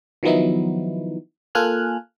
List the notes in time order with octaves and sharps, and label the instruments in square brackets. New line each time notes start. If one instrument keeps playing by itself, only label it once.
[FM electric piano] D#3 F3 F#3 B3 D#4 E4
A#3 F4 A4 G#5 F6 F#6